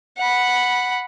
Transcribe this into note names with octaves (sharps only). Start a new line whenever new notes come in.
F#5 B5